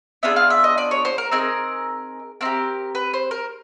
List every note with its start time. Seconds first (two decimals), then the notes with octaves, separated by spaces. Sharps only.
0.23 B3 D4 F4 G#4 E5
0.36 F5
0.50 E5
0.64 D#5
0.78 D5
0.91 C#5
1.05 C5
1.18 A#4
1.31 C4 D#4 G#4 A#4
2.41 C4 E4 A#4
2.45 G4
2.95 B4
3.14 C5
3.31 A#4